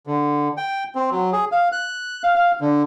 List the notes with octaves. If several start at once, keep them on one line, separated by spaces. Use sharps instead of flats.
D3
G5
C4
F#3
G#4
F5
F#6
F5
F5
D3